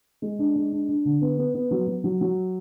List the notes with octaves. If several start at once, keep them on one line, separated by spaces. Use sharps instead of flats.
G#3
D4
G#3
D4
D4
D3
B3
B3
B3
F#3
F#3
F#3
F#3